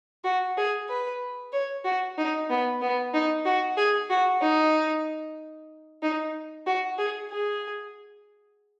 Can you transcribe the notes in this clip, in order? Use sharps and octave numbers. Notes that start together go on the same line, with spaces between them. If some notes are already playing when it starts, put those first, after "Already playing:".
F#4
G#4
B4
C#5
F#4
D#4
B3
B3
D#4
F#4
G#4
F#4
D#4
D#4
F#4
G#4
G#4